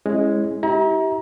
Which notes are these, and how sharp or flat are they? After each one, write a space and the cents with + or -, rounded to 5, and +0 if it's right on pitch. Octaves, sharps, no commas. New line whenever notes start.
G#3 +0 C#4 -30 E4 +0
E4 -35 G4 -20 A#5 +25